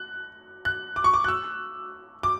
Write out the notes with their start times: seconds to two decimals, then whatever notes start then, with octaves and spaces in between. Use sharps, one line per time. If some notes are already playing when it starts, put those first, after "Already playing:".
Already playing: F#6
0.65 F#6
0.96 D6
1.04 C#6
1.14 D6
1.24 F#6
1.28 E6
2.23 D6